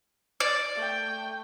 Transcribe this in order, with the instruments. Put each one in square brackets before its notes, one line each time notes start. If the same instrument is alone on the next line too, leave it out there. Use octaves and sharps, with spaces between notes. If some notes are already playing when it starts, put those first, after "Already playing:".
[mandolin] D5
[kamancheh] A3 G5